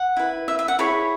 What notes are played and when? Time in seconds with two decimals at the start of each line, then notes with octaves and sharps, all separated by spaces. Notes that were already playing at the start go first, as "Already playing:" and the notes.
Already playing: F#5
0.17 E4 B4
0.48 E5
0.59 E5
0.68 F#5
0.79 E4 G#4 C#5 B5